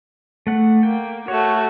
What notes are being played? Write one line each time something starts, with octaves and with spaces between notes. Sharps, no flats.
A3 F#5
A#3 G5
A3 F#4 C#5